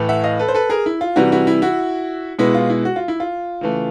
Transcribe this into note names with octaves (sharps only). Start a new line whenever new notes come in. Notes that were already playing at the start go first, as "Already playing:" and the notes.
Already playing: A2 E3 A3
E5 F#5
D#5 F5
A4 B4
C5
A4 B4
G#4 A#4
E4
F4
C3 E3 G3 E4 F#4
E4 F#4
E4
E4 F#4
B2 G#3 B3 E4
F4
E4
F#4
F4
E4
F4
C#3 E3 A3